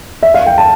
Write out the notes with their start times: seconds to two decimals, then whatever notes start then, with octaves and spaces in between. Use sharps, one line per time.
0.23 E5
0.34 F5
0.46 G5
0.58 A5